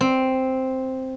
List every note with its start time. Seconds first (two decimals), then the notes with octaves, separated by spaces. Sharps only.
0.01 C4